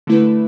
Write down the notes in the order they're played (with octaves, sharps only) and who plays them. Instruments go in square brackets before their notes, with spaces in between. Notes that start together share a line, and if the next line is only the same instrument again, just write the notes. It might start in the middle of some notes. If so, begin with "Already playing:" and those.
[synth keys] D3 A3 E4 B4